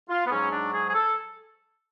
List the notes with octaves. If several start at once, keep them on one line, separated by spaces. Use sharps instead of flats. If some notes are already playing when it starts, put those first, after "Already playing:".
F4
B3
G#2 F#3 C#4
D4
G#4
G#4
A4